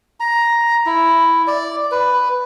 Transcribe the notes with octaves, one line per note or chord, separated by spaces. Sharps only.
A#5
E4
D5
B4